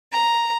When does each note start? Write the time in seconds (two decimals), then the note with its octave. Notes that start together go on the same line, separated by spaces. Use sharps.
0.13 A#5